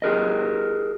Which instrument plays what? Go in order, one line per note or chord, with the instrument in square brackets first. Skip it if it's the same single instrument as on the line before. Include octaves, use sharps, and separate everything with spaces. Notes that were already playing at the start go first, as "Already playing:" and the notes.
[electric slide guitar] G4 G#4 A#4 D#5